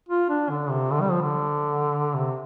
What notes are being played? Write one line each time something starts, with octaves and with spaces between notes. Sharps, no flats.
F4
D4
D3
C3
D3
G3
F3
D3
C3